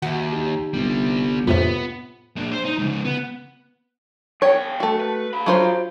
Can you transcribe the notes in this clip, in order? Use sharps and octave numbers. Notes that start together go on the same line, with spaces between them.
D#2 F#4 E5 F#5
D#4 G4
G1 C3 G3
F2 A2 C3 B3 F4
A#2 D4
C5
D#4
G#2 C#3
B3
E2 C#5 G5
A3 F#4
B4
F5 B5
F#3 F4 C5